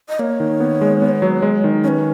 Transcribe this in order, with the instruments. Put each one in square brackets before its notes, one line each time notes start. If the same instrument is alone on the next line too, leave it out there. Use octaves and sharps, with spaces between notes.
[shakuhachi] D#5
[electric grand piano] A#3 [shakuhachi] C#5
[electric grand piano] D#3
B3
G#3
B3
F#3
G#3
D#3
[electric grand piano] C#4 [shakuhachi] B4 C#5